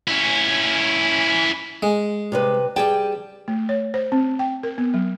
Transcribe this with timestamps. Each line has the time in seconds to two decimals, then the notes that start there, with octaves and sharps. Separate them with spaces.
0.08 C#4 E4
1.83 G#3
2.32 C3 G3 B4
2.76 G3 G#4 G5 A5
3.48 A3
3.69 C#5
3.94 C5
4.12 C4
4.39 G5
4.63 A#4
4.78 B3
4.94 F#3